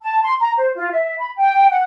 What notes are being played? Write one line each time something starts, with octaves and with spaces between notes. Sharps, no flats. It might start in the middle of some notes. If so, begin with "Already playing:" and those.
A5
C6
A#5
C5
F4
E5
B5
G5
F#5